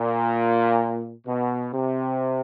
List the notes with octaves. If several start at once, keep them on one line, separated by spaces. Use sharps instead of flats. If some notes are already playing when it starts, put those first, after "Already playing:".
Already playing: A#2
B2
C3